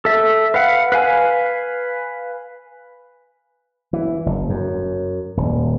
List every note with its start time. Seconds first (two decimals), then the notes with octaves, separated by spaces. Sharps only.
0.05 A4 E5
0.54 B4 F5 F#5
0.92 B4 F5 G#5
3.93 E3
4.26 F#1
4.50 F#2
5.37 D#1